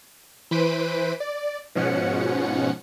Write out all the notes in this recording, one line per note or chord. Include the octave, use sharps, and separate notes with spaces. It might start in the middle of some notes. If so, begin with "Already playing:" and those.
E3 B4 C5 B6 D7 D#7
D5
G#2 B2 F3 C#4 F#5 C#7